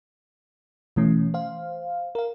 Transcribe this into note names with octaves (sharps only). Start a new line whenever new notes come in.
B2 E3 A3 C#4
C5 F5
A#4 F5